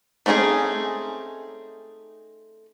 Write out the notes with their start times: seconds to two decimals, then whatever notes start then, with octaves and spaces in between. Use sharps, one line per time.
0.26 A3 C4 C#4 D#4 G#4